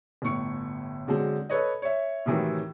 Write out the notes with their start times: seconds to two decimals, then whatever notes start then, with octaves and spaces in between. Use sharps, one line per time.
0.22 G1 A2 C#6 C#7
1.08 D3 F#3 G#3 C4
1.50 A4 B4 C#5 D#5
1.82 C#5 E5
2.26 A2 C3 D#3 E3 F#3